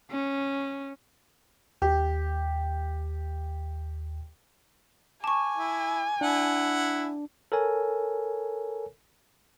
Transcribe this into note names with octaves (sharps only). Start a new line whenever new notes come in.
C#4
D#2 G4
G#5 A5 C#6 D6
E4
D4 E4 F#5
A4 A#4 C#5 G#5